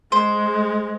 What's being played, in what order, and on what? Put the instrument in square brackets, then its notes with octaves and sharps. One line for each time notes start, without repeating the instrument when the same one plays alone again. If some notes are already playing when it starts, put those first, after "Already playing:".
[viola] G#3 [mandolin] C5